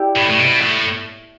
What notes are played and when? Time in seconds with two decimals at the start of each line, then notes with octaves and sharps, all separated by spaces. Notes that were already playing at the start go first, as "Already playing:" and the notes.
Already playing: E4 G4 D5
0.16 A2
0.29 A2
0.39 B2
0.61 A2